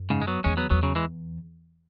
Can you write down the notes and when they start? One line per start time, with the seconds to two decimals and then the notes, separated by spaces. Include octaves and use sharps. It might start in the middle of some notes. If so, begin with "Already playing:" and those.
Already playing: F#2
0.10 G#2 C#3
0.22 G#3
0.27 F#3 B3
0.44 E2 G#3 C#4
0.57 F#3 B3
0.70 E2 F#3 B3
0.83 C#3 F#3
0.95 E3 G#3